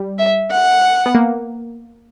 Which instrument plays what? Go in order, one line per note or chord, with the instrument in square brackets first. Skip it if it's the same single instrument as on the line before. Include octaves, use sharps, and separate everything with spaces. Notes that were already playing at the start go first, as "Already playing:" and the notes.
Already playing: [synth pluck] G3
[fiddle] E5
F#5
[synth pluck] B3
A#3